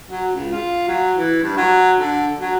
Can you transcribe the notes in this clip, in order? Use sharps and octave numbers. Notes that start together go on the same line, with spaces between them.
F#3
C#2
F4
F#3
E3
G2
F#3
D3
F#3